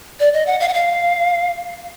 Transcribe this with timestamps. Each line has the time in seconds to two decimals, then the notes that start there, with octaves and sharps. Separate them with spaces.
0.20 D5
0.34 D#5
0.47 F#5
0.60 F5
0.68 F#5
0.74 F5